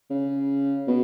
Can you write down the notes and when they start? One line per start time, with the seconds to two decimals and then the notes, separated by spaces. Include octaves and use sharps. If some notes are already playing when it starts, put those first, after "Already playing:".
0.11 C#3
0.88 B2